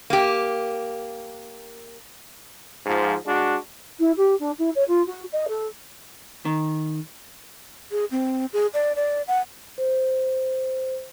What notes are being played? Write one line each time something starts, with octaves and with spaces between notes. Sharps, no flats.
A#3 G4
G#2 F3
G#3 D4 F#4
E4
G4
D4
E4
C#5
F4
F#4
D#5
A4
D#3
G#4
C4
G#4
D5
D5
F#5
C5